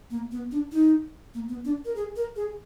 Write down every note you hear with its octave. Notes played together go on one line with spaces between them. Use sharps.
A#3
B3
D4
D#4
A#3
B3
D4
A#4
G#4
A#4
G#4